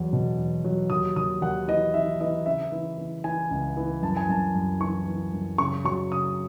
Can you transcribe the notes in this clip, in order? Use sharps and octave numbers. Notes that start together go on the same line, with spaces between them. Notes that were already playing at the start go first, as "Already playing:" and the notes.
Already playing: E2 F#3
B2
E2
F#3
D#2 D#6
D#2 D#6
D#2 F#5
E3 D#5
E3 E5
E3 D#5
C#3 E5
E3
E3
E3 G#5
C#2
E3
F#2 A5
G#5
F#2 A5
F#2
E3 C#6
E3
F#2
C#3 C#6
F#3 C#6
C#3 D#6